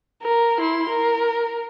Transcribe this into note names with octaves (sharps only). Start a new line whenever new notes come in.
A#4
E4 C6
A#4